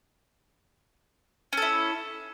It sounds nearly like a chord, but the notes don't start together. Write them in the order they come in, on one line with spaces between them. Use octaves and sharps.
C#4 A4 E4